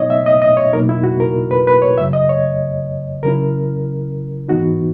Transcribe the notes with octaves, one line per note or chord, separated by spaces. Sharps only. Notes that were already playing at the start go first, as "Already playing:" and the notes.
Already playing: B2 F#3 B3 D#4 C#5 D#5
E5
D#5
D#5
C#5
B2 F#3 A#3 D#4 A#4
E4
F#4
A#4
B4
B4
C#5
F#2 C#3 F#3 E5
D#5
C#5
C#3 F#3 C#4 E4 A#4
G#2 E3 B3 D#4 F#4